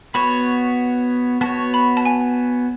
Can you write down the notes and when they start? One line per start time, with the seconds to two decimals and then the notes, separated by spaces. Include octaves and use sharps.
0.14 B3 F#4 C#5 B5
1.41 B3 F#4 C#5 A5
1.74 B5
1.97 A5
2.05 G#5